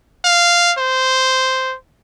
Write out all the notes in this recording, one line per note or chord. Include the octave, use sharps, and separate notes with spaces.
F5
C5